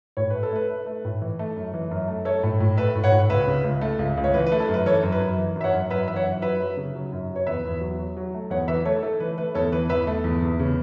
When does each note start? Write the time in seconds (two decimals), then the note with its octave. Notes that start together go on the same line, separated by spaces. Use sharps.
0.17 A2 C#5
0.30 A3 B4
0.43 A4
0.52 A3 B4
0.70 A3
0.86 A3
1.05 A2
1.22 E3
1.39 A3
1.56 F#2
1.74 E3
1.91 F#2
2.08 A3
2.25 A3 A4 C#5
2.43 A2
2.60 A2
2.77 A3 B4 E5
2.95 A2
3.04 C#5 F#5
3.12 A2
3.30 C#2 B4 E5
3.47 C#3
3.64 C#2
3.81 A3
3.99 C#2
4.17 C#2
4.24 C#5
4.34 E3 B4
4.46 B4
4.52 A3
4.60 A4
4.68 F#2
4.74 B4
4.86 E3 A4 C#5
5.03 F#2
5.12 B4
5.20 F#2
5.38 E3
5.56 F#2
5.61 E5
5.64 C#5 F#5
5.73 F#2
5.90 F#2 B4 E5
6.08 E3 E5
6.16 C#5 F#5
6.25 F#2
6.42 F#3 B4 E5
6.60 F#3
6.77 C#3
6.95 F#3
7.12 F#2
7.30 F#3
7.36 C#5
7.46 E2 B4 E5
7.64 E2
7.81 F#3
7.99 F#3
8.17 F#3
8.34 A3
8.50 E2 C#5 F#5
8.68 E3 B4 E5
8.85 A3 A4 C#5
9.02 A3 A4
9.20 E3 B4
9.38 A3 B4
9.55 E2 A4 C#5
9.72 E3 B4
9.89 E2 B4 E5
10.07 A3
10.24 E2
10.42 E2
10.59 C#3